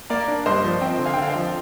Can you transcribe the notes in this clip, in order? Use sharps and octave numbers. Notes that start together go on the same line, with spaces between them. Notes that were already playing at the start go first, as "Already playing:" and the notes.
A#3 A#4 D5
D4
G2 C5 D#5
F3
C4 D#5 G5
D3
F5 G#5
G5
D3 F5
C5 D#5
F3